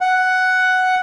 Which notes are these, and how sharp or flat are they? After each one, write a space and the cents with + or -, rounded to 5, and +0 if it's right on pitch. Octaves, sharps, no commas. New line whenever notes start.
F#5 +5